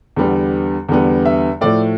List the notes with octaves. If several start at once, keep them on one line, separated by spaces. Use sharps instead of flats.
E2 D3 G3 B3
E2 D3 G3 B3
E5
A2 F3 A3 D5